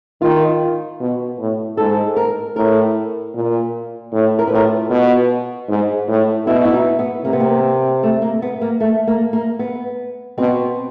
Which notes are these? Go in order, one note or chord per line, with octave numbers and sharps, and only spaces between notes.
D#3 F4
B2
A2
G#2 A4
A#4
A2 A#4
A#2
A2
A#4
B4
A2 A#4
F4
B2
G#2
A2
B2 E4
E4
D#4
B3
C3 A#3
B3
A#3
A3
A#3
B3
A#3
A3
A#3
A#3
B3
B2 C4